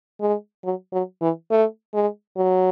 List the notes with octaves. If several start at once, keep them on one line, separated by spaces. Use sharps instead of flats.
G#3
F#3
F#3
E3
A3
G#3
F#3